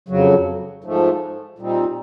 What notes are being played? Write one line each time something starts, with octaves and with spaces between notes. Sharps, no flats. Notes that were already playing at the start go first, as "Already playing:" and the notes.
F2 C#3 F#3
G#2 F3 A3
A#2 G3 C4 D#4